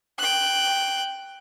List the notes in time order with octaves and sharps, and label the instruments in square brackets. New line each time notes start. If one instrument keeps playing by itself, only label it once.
[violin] G5 F#6